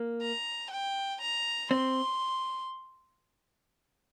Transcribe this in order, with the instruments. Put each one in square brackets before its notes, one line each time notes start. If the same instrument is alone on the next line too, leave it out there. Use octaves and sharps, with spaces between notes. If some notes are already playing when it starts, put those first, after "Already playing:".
Already playing: [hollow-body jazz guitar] A#3
[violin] A#5
G5
A#5
[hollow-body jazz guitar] C4 [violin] C6